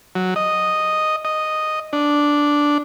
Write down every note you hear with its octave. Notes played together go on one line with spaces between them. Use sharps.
F#3
D#5
D#5
D4